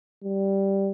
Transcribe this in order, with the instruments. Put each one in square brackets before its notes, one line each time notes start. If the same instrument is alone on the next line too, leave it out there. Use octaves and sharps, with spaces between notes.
[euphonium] G3